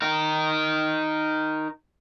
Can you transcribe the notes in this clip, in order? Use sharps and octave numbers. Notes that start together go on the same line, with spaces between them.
D#4 A#4